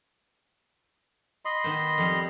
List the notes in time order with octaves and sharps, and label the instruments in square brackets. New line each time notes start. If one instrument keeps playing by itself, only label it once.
[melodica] D#5 B5 C6
[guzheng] D#3 B3 C5
F2 G3